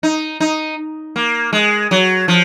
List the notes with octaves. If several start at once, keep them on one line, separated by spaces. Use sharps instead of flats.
D#4
D#4
A#3
G#3
F#3
F3